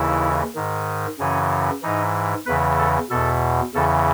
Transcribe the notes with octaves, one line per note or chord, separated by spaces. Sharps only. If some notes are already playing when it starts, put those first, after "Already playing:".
Already playing: D#2 C#3 E3 E4
G#2 D#3
F#2 C#3 E3 C#4
G#2 E3 D#4
E2 C#3 E3 B4
A4
E2 B2 A4
E2 C#3 E3 A4